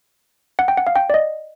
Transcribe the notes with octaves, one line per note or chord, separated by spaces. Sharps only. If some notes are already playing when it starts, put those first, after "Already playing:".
F#5
G5
F#5
F5
G5
D5
D#5